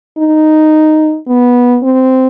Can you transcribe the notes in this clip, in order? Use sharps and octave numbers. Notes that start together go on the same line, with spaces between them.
D#4
B3
C4